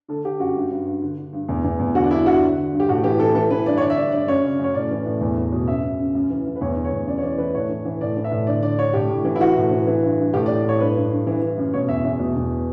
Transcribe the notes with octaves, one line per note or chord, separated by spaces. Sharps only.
D3 A4
D3 G4
F#2 F#4
G2
G2
G2
D3
D3
G2
E2
E2
E2
D3 F#4
D4
G2 E4
G2 F#4
D3
D3
G2
G4
A2 F#4
E3 G4
E3 A4
E3 A4
E3 B4
G2 D5
C#5
D3 D5
E5
G2 D5
G2 D5
F#2 C#5
C#3
F#2 C#5
A2 D5
E3
A2
E2
E2
B2
F#2 E5
F#2
C#3
F#2
E3
E3
B4
E2 C#5
D3
C#5
E2
F#2 D5
C#5
E3 D5
E3 B4
A2 C#5
E3
E3
A2 D5
E3
E5
A2
D3 D5
D3 D5
D3 C#5
A2 G4
A2
E3
E4
E3 F#4
A2
E3
E3
G2
G2
A2 G4
D5
A2
A2 C#5
G2 B4
G2
G2
E3
E3
F#2
B2 C#5
E2 E5
E2 E5
B2
E2